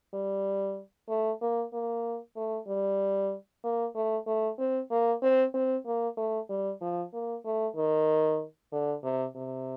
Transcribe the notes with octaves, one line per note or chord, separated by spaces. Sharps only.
G3
A3
A#3
A#3
A3
G3
A#3
A3
A3
C4
A#3
C4
C4
A#3
A3
G3
F3
A#3
A3
D#3
D3
C3
C3